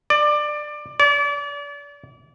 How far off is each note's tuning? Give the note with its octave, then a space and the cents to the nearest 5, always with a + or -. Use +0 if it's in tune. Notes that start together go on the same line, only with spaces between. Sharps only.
D5 +20
D5 -35